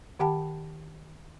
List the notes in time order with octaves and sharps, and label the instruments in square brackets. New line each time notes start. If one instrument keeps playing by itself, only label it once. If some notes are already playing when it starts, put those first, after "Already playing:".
[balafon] D#3 G4 F#5 G5 A5 B5